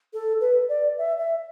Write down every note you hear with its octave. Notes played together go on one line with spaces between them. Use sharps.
A4
B4
D5
E5
E5